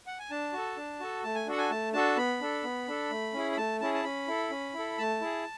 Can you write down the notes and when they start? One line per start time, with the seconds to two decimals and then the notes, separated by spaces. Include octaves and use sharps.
0.07 F#5
0.19 G#5
0.30 D4 A5
0.53 F#4 A4
0.77 D4
1.00 F#4 A4
1.23 A3 A5
1.35 G#5
1.47 D4 F#4 A4 F#5
1.58 G#5
1.70 A3 A5
1.93 D4 F#4 A4 A5
2.17 B3 B5
2.41 D4 A4
2.64 B3
2.88 D4 A4
3.10 A3
3.34 C#4 E4 G#4
3.52 B5
3.57 A3 A5
3.81 C#4 E4 G#4 A5
3.94 A5
4.04 C#4 B5
4.28 E4 A4
4.50 C#4
4.74 E4
4.79 A4
4.98 A3 A5
5.21 E4 G#4